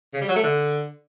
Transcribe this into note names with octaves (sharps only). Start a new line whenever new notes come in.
C#3
G3
F#3
A3
D3